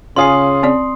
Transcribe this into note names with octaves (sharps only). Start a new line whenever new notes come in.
C#3 C#4 F4 G#4 C6 D#6 C7
C4 D5